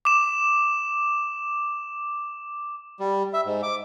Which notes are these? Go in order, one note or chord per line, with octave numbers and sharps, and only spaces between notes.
D6 E7
G3
E5
G#2
D6